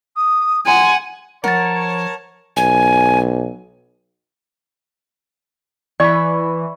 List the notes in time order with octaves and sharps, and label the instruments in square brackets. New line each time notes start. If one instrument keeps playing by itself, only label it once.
[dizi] D#6
[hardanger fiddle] F#5 [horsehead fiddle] G#5 [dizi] C6
[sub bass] F3 [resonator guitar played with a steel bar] A#4 [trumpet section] C#5 A5 [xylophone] F#5 A6
[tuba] B1 [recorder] G#5
[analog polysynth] E3 [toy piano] D5 [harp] B5 C#6